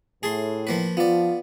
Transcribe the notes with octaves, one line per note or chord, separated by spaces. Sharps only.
A2 G#4 A5 C6
F3 A#3 B4
F3 B3 F4 D5